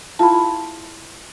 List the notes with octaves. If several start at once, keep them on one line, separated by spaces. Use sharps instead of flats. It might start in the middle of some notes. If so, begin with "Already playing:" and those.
E4 F4 G#4 A5 B5